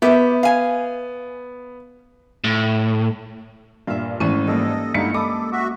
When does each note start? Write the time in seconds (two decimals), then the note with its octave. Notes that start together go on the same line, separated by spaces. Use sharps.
0.02 B3 G4 E5
0.43 F5 G#5
2.44 A2
3.87 G2 A#2 E5 F5
4.20 G#1 E3 A3 C#4 D#4 D#7
4.47 G3 A#3 A4 D#5
4.94 G2 D3 E3 G#3 D#4 E4 C#7
5.14 A4 D#5 B5 D6
5.52 F#4 E5